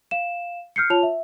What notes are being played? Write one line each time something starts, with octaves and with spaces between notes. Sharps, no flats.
F5 E7
F6 G6 C7 C#7
F4 C#5 A5 F7
E5